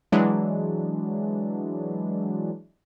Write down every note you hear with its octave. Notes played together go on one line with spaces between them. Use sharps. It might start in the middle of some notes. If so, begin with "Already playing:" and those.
E3 F#3 G#3 D4